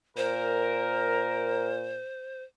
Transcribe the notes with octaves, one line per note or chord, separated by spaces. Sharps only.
A#2 A#4 C5